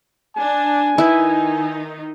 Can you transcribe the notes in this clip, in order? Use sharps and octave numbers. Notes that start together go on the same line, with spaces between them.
D4 G#5
D#3 D#4 E4 B4